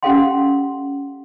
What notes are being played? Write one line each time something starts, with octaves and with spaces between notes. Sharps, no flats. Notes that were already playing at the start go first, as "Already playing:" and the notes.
C#4 G4 A4 F5 F#5 C6